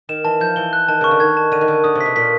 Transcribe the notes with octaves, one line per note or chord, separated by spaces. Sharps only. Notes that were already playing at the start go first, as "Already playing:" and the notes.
D#3 E7
E3 A5
F3 G6
E3 G7
F#6
D#3 A5
C#3 C#6
D3
D#3 G#6
A5
D3 D#7
D#3
D3 D#7
D3 D#6
C3
B2 B6
A#2 B6